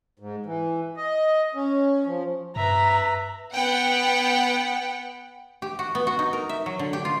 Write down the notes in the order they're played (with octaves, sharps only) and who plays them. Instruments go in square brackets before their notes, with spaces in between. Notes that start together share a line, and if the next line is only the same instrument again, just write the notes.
[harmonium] G#2
E3
D#5
C#4
F3
[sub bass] G2 [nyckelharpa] B4 E5 [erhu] A#5
[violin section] B3 F#5 G5
[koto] G4
F#4
B3
F#4
D#4
A#4
E5
F#3
D3
G4
F4